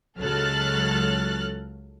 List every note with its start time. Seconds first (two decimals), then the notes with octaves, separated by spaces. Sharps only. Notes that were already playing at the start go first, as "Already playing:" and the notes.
0.19 C#2 F#3 A4 F6 F#6 A6